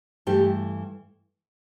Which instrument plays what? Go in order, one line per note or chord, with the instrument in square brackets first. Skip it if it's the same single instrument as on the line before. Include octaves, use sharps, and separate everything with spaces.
[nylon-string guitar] G2 E3 A3 G4